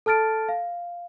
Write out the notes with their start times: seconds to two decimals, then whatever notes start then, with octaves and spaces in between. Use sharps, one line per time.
0.06 A4 A5 F6 A6 D7
0.49 F5